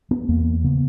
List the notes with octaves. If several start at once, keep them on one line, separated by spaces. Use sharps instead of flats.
B3
E2 A#3
C#3 B3